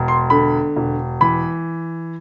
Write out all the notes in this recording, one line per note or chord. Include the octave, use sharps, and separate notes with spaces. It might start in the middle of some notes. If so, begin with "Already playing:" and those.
Already playing: E1
C6
D3 B5
E1
E3 B5